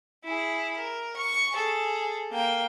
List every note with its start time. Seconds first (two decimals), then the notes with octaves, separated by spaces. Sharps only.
0.24 E4 G#4
0.77 A#4
1.16 C#6
1.52 G#4 A4
2.32 A#3 G5